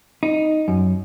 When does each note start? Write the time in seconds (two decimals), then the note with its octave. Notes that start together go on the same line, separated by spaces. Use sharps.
0.23 D#4
0.68 F#2